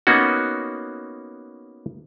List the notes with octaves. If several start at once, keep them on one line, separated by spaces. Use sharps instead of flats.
A#3 B3 C#4 D#4 F#4